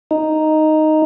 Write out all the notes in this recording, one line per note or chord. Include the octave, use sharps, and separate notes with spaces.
D#4